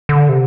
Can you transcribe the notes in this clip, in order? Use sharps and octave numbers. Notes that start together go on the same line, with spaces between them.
D3
C3